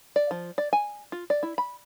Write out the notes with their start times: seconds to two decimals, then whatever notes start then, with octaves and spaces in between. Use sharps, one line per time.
0.16 D5
0.31 F3
0.58 D5
0.73 G#5
1.12 F4
1.30 D5
1.43 E4
1.58 B5